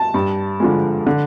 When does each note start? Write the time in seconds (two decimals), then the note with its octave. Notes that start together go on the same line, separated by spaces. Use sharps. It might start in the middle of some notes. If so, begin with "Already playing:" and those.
Already playing: A5
0.14 G2
0.60 D3 F3 G#3
1.07 D3